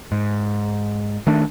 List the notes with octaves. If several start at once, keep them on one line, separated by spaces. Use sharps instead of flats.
G#2
D#3 A3 D4